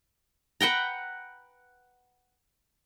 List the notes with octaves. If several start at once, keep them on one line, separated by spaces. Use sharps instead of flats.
B4 F#5 G5 A#5